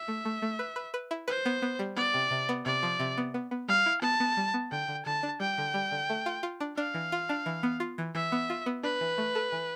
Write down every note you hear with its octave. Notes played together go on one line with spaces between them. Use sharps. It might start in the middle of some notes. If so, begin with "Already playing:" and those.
Already playing: E5
A3
A3
A3
B4
B4
B4
E4
B4 C5
B3
B3
G3
B3 D5
C3
C3
B3
C3 D5
F3
C3
B3
B3
B3
G3 F5
E4
B3 A5
B3
G3
B3
D3 G5
D3
D3 A5
D4
G3 G5
D3
G3
D3
A3
F4
F4
D4
D4 F5
E3
F4
D4
E3
B3
F4
E3
E3 E5
B3
F4
B3
D4 B4
E3
A3
A4
E3